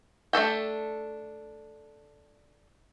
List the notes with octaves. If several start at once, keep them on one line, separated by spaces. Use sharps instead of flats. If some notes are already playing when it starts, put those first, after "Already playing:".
A3 D4 A4 G5